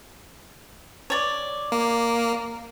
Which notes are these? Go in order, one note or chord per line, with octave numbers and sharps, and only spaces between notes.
C#5 D5
A#3